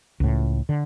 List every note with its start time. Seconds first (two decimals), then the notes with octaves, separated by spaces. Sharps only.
0.20 C#2 A2
0.69 D3